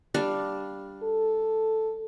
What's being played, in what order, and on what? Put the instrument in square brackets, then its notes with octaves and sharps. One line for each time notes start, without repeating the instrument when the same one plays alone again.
[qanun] G3 D4 F5
[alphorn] A4